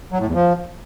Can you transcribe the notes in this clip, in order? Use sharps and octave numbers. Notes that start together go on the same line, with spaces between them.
F#3
A2
E2
F3